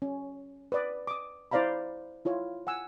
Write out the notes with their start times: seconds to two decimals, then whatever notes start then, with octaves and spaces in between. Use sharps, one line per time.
0.02 C#4
0.72 B4 D5 D#6
1.07 D6 D#6
1.51 E4 C5 D5 F5 A#5 B5
2.25 E4 F4 C#5
2.67 F#5 G#5 E6